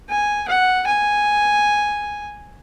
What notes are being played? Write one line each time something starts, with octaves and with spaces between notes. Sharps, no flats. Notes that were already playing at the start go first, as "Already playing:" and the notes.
G#5
F#5
G#5